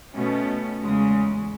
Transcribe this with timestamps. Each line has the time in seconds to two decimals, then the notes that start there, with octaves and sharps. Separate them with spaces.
0.15 B2 A3 C#4
0.82 E2 C#3 G#3